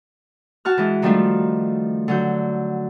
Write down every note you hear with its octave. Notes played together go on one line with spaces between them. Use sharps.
F#4 A5 F6
E3 G#3
D#3 F3 G3 A3 D4 F4
D3 F#3 G6